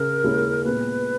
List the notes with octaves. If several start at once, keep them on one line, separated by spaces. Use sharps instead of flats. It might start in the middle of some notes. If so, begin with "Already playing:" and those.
Already playing: C#3 A#4
D#2 C#3 G#3 C#4 E4
A#2 G#3 B3 B4